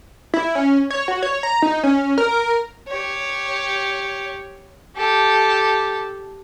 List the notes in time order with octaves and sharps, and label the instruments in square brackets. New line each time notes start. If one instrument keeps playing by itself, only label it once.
[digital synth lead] E4
C#4
C#5
F#4
C#5
A#5
D#4
C#4
A#4
[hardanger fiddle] G4 C#5
G4 A4